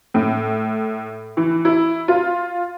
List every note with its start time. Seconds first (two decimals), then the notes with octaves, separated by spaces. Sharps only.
0.14 A2
1.37 E3
1.65 E4
2.08 F4